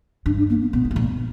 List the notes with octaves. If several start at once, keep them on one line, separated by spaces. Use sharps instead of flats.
G2 D4
D4
A#3
B3
A#2 B3
F#3
G2
A#2